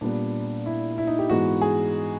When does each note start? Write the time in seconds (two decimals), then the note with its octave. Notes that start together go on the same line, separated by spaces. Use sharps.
0.01 A#2 G3 B3 D4
0.66 E4
0.98 E4
1.07 D#4
1.19 G4
1.30 G#2 E3 G#3 B3 F#4
1.61 G#4